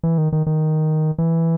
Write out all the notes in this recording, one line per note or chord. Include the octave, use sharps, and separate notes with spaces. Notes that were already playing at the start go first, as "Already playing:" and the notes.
E3
D#3
D#3
D#3
E3